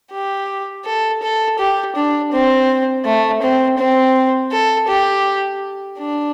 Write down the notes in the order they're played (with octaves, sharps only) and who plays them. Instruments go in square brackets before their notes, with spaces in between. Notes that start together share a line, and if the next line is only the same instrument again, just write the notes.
[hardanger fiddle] G4
A4
A4
G4
D4
C4
A3
C4
C4
A4
G4
D4